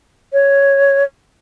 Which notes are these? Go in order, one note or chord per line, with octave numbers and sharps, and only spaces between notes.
C#5